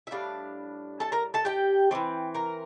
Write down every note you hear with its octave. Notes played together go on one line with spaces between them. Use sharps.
E5
A2 G3 D4 F5
A4 A5
A#4 A#5
A4 A5
G4 G5
E3 G3 C4
A#4 A#5